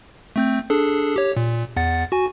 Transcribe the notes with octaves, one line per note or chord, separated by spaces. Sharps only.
A3 C4 G6
D4 G#4 A4
G4 C#5
A#2
E2 F#5 A6
F#4 G#5